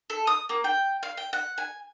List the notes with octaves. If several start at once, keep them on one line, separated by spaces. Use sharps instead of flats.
A4
D#6
A#3
G5
F5
G5
F#5
G#5